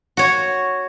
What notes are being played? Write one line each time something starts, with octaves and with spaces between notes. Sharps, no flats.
F#4 C#5